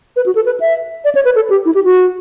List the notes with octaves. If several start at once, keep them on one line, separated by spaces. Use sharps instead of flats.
B4
F#4
A4
B4
E5
D5
C#5
B4
A4
G4
E4
G4
F#4